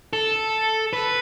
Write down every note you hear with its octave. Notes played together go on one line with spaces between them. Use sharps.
A4
B4